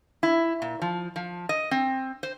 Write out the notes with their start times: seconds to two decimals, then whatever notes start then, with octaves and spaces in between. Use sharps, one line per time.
0.23 E4
0.62 A#2
0.82 F3
1.16 F3
1.49 D#5
1.71 C4
2.23 C5